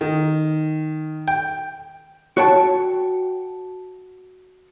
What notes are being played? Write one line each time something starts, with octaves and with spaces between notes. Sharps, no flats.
D#3
G5
F#4 C#5 G5 A5